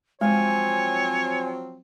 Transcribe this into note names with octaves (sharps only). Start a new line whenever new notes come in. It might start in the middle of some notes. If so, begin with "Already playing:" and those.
F3 F#3 G#3 C4 C#5 G#5